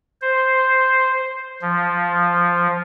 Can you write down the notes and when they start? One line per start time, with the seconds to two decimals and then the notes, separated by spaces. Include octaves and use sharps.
0.22 C5
1.62 F3